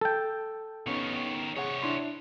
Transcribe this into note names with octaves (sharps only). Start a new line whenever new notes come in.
A4 G5
D#3 B3 C#4 D#4 C#5
C3 G#4 C#5 F#5
D4 E4 C6